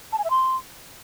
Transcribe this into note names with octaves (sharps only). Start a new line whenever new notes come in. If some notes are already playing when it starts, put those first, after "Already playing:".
A5
G#5
E5
C6